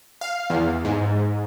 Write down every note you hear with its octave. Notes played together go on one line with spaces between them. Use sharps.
F5
E2
G#2